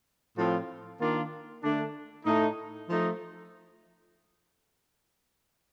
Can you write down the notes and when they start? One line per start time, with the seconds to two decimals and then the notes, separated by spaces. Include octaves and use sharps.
0.36 A2 F3 C4 F4
0.99 D#3 A#3 D4 F4
1.62 D3 A3 D4
2.25 A2 A3 D#4
2.88 F3 A3 D#4